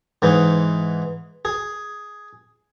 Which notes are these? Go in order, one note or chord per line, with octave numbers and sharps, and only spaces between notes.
G#2 E3 D#4
G#4